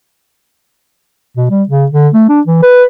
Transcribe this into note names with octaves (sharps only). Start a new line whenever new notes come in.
B2
G3
C#3
D3
A3
D4
E3
B4